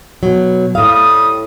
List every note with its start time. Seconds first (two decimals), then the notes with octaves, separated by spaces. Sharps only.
0.23 B2 F#3
0.75 A2 G3 F5 D#6